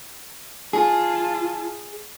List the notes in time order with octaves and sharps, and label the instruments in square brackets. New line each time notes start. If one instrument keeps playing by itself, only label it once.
[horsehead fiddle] F4 A5 [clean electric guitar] G#4